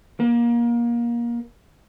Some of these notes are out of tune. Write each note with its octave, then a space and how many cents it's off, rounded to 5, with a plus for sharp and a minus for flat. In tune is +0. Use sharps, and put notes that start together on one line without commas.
A#3 +25